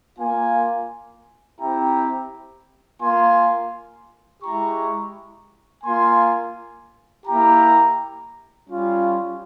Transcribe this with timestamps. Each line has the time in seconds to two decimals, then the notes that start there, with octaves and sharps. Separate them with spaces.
0.18 A#3 F4 F5 G#5
1.59 C4 E4 G4 G5 A#5
3.01 A#3 F4 G#5 C6
4.43 G#3 E4 G4 A#5 C#6
5.84 A#3 F4 G#5 C6
7.26 A#3 E4 G4 G5 A#5
8.67 G3 C#4 F4